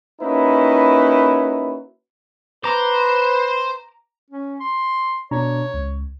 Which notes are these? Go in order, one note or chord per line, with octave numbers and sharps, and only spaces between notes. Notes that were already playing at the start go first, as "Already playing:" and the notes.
A#3 C#4 D#4 E4 F#4 B4
B4 C5 A#5 D6
C#4
C6
B2 D4 C#5 A#5
C#2